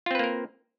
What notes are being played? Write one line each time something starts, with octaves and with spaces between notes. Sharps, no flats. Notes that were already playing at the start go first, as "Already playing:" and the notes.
A#3 C4 F4 A#4 B4